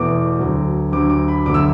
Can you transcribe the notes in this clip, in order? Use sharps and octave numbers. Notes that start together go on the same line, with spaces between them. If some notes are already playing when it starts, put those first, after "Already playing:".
Already playing: E2 B2 A3 D6
D2 D3 F#3
D2 D3 F#3 D6
D6
B5
E1 D2 D3 F#3 A3 D6
E6